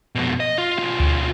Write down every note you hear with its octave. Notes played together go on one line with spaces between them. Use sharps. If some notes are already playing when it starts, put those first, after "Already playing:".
F2 B2
D#5
F4
B1 F4
D2 D7 E7